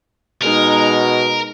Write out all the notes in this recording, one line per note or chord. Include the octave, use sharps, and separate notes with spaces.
B2 G#3 D#4 A#4